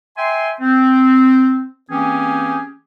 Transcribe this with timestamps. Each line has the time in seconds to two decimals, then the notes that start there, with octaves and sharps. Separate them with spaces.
0.17 E5 G5 G#5 C6
0.61 C4
1.91 E3 A#3 C4 C#4 G4 G#4